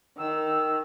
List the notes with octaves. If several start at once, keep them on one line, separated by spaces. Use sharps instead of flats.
D#3 E6